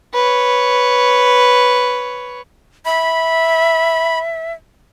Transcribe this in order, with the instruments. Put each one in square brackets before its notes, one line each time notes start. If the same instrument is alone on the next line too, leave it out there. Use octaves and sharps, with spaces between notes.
[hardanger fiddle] B4 C#5
[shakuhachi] E5 [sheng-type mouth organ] B5